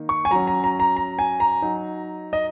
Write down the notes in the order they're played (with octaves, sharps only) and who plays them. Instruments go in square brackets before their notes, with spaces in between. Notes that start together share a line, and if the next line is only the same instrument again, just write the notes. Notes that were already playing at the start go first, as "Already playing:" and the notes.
Already playing: [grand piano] D#3 A#3 D#4
C#6
G#5
F#3 C#4 A#5
A#5
A#5
A#5
A#5
G#5
A#5
F#3 D#4
D#5